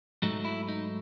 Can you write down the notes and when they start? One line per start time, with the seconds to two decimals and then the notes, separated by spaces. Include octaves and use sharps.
0.22 G#2 F#3 A3 D#4
0.45 E4
0.68 D#4